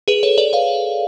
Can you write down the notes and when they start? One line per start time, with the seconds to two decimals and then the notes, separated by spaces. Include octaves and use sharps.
0.08 G#4 B4
0.23 A4 C#5
0.38 B4 D5
0.53 C#5 F5